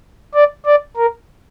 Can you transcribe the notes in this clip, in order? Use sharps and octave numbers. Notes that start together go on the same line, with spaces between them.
D5
D5
A#4